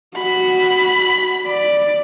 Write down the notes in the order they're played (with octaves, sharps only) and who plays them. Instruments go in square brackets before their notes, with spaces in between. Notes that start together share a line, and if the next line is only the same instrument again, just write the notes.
[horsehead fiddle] F#4 [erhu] B5
[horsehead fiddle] D5